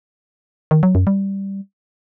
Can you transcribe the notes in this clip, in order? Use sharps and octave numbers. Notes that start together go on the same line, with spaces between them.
D#3
F#3
F#2
G3